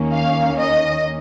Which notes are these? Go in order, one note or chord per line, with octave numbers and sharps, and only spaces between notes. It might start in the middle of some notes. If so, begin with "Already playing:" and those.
Already playing: D#2 D#3 A#3 C#4
F5
D#5